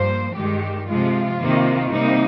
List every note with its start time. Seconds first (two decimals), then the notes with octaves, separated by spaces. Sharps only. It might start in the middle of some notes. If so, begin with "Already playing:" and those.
Already playing: G2 F3 A#3 C5
0.35 G2 D#3 G#3 G4
0.87 C3 F3 G#3 F4
1.39 C3 D#3 A#3
1.91 C3 G3 A#3 D#4